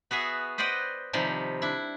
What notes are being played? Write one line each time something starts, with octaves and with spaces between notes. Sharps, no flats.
B3 F#4 G#4 E5
B4 C5 D5 D#5 F#5 G5
C3 D#3 F3 G3
D4 E4